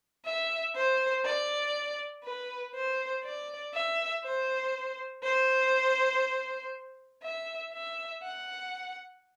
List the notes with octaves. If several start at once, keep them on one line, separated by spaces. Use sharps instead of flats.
E5
C5
D5
B4
C5
D5
E5
C5
C5
E5
E5
F#5